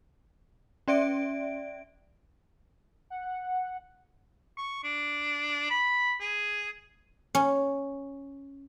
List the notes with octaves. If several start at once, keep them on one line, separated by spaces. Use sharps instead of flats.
C#4 D5 E5 D7
F#5
F#5
C#6
D4
B5
G#4
C#4